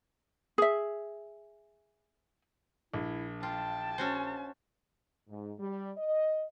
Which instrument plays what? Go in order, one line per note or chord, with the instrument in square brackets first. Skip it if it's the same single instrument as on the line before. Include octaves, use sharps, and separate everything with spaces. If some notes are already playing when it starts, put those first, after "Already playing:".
[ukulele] G#4 E5
[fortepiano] A#1 [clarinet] E4
[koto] F4 [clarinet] G5 [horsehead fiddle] A5
[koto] C#4 F#4 C5
[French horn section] G#2
G3
D#5